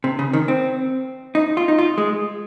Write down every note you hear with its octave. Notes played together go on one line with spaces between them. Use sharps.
C3
C#3
D#3
C4
D#4
F4
D#4
F4
G#3